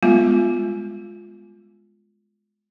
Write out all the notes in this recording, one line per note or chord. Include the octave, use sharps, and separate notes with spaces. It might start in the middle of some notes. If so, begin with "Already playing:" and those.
G3 G#3 B3 F4